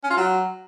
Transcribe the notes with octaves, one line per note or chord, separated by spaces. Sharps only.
C#4
F4
F#3